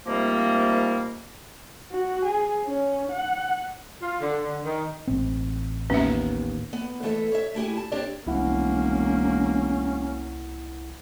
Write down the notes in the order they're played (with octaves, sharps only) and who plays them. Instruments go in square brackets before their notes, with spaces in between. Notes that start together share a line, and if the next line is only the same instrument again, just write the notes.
[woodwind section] C3 D#3 F3 G3 A3 A#3
[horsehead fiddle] F#4
G#4
C#4
F#5
[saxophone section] F4
D3
D3
D#3
[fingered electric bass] A1 C4
[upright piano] D#2 B3 [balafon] C#4 E5
[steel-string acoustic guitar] B3
E3 A3 B3 A4 D5 E5
C#5 E5
A3 E4 G4 G#4
A5
C4 D4 G4 C#5 D5
[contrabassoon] E1 [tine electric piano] C2 E4 F#5 [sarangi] A#3 [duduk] C#4